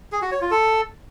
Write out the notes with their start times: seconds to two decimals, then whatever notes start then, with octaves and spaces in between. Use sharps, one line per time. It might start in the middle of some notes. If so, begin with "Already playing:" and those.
0.12 G#4
0.22 F#4
0.31 C#5
0.41 F4
0.51 A4